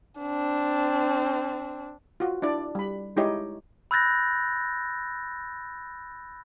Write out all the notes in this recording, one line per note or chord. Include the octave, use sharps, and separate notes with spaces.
C4 D4
F4 F#4
D4 E4 D5
G3 B5
G#3 D#4 E4 G4 C#5 D#5
B5 E6 F#6 G6 A6 A#6